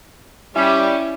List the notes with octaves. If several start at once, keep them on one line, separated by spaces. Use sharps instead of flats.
G3 C#4 E4 G4 E5 G#5